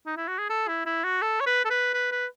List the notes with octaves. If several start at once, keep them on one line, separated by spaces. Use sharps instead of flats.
D#4
E4
F#4
G#4
A4
E4
E4
F#4
A4
C#5
B4
A4
B4
B4
B4